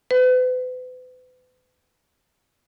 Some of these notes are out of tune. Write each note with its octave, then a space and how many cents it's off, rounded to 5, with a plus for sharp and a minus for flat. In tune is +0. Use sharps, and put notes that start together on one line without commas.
B4 +40